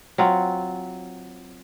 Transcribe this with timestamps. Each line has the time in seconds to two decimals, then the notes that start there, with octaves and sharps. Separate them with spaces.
0.18 F#3 C4 F4 F#5